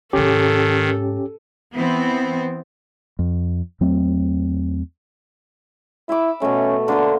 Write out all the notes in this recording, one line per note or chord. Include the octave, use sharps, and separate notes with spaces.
G#2 C3 D#3 C#4 G4 A4
E3 B3 C4
F2
E2 F#3 A3 C4
E4 E5 B5 D6
B2 A3 C#4
D3 A#3 D4 C5